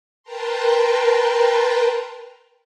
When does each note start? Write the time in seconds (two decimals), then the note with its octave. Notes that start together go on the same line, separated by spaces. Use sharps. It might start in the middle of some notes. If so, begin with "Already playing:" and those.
0.23 A#4 B4 G5 A5 A#5 C6